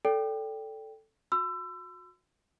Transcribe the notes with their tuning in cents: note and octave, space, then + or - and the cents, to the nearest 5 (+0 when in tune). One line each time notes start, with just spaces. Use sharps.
A4 +0 D5 -35 G5 +0
F#4 -30 C6 -45 E6 +25